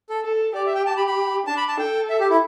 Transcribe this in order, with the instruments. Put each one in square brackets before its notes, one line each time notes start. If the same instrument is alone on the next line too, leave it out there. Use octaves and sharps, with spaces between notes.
[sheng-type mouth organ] A4
[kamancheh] A4
[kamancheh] G4 [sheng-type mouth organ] D5
[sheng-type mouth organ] E5
G5
A5
B5
B5
[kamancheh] D4 [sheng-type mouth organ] A5
[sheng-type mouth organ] B5
A5
[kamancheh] A4 [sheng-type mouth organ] G5
[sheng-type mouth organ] E5
G4
E4